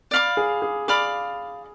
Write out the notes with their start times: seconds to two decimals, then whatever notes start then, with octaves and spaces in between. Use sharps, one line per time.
0.11 D5 F5 B5 D6
0.37 G#4
0.62 G#4
0.88 G#4 D5 F5 B5 D6